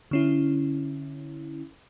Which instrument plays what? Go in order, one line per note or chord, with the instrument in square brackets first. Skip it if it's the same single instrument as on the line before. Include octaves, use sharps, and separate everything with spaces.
[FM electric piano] D3 C#4 E4